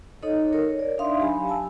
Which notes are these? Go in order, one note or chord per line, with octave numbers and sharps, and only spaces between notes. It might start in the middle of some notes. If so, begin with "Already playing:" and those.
D#4 A4 C#5 D#5
A#4 C#5
D5
D4 D#4 E5 F5 C6 D#6
F#3 G4 F5 G#5 B5
F5 G#5 A5 E6